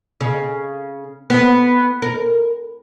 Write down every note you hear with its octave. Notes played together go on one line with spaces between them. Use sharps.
C#3
B3
A#4